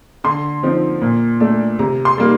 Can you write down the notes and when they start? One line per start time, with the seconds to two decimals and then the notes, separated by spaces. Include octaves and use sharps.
0.24 D3 C6
0.63 F3 C4 D#4
1.01 A#2
1.40 A3 D4
1.79 C3 A#5
2.05 C6
2.18 G3 A#3 D#4